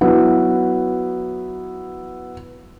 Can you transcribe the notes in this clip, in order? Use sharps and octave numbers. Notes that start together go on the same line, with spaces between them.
F#3 B3 E4